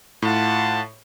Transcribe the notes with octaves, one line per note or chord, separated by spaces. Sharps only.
A2 F4 F#5 A5